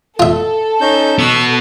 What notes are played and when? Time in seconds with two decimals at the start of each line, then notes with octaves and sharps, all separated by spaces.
0.20 F4 A4 E5
0.81 C#4 D#4 G6
1.19 B3 F#4 C#6 E6